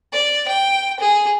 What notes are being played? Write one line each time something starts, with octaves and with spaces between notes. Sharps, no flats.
D5
G5
G#4